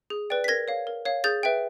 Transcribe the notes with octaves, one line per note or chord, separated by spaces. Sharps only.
G#4
B4 D5 G5
B6
A#4 G#6 A#6
C#5 F5
A#4
C#5 F5
G#4 G6 A6
B4 E5 G5